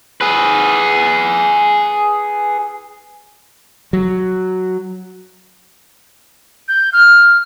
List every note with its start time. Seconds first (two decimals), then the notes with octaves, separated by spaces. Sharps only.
0.21 G#4 B4
3.93 F#3
6.68 G6
6.93 F6